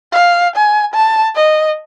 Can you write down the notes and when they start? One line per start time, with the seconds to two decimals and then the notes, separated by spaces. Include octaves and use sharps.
0.13 F5
0.56 G#5
0.94 A5
1.36 D#5